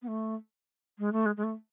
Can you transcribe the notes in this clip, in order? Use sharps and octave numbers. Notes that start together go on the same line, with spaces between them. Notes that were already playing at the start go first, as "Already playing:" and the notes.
B3
A3
G#3
A3
G#3
G#3
A3